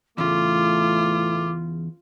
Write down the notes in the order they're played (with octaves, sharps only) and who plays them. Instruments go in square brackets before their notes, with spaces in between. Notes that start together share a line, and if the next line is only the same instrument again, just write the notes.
[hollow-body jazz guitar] E2 C#3 [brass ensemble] A2 E3 A3 [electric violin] F4 [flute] D6